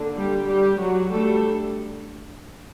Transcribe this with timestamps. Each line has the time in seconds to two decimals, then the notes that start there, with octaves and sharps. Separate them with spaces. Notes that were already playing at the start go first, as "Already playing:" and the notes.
Already playing: D3 A#3 D4
0.17 G3 G4
0.48 G3 G4
0.79 F#3 F#4
1.10 G3 A3 D4 A4